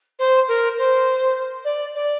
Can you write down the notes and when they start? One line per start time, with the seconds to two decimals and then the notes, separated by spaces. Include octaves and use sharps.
0.18 C5
0.47 A#4
0.77 C5
1.64 D5
1.94 D5